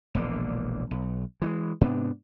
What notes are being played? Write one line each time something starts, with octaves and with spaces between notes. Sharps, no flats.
E1 A#1 D3 A#3
B1
E3 F#3 G#3
G#2 C3 B3 D4